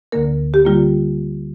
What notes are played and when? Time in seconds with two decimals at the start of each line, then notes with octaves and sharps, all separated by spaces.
0.12 D2 D3 A#3 A#4
0.54 G4
0.65 D3 G3 A#3 F4